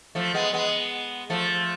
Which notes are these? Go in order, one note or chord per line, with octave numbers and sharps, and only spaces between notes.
F3 A3
G#3 B3
G#3 B3
F3 A3